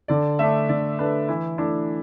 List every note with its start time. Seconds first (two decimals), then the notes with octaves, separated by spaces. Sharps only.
0.08 D3 D5
0.39 A3 D4 E5
0.69 D3 D5
0.99 A3 D4 B4
1.29 E3 E4
1.58 A3 D4 E4